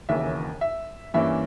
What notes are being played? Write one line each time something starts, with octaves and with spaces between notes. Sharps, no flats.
E1 D#2 C#3 E3 E5
E5
G2 E3 A#3 C#4 E5